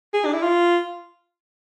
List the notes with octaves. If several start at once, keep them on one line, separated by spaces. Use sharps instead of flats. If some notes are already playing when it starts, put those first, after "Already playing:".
G#4
D4
E4
F4